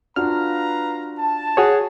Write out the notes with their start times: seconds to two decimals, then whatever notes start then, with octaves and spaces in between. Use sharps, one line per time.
0.16 D4 F4 F#4 B4 F5 A#5 F6
1.18 A5
1.57 F#4 G#4 C#5